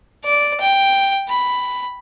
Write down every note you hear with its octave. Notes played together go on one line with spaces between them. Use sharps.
D5
G5
B5